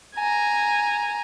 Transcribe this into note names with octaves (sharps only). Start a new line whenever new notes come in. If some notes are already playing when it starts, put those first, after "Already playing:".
G#5 A#5